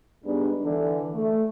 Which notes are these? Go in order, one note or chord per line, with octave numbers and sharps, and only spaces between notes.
G#2 G3 B3 D4
D3 E3
A3